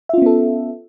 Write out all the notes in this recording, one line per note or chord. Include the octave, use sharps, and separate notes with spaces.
B3 C#4 F4 A4 E5